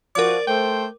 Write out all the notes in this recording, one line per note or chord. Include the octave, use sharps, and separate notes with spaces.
F3 F#4 A#4 D5 D6
A3 C5 G5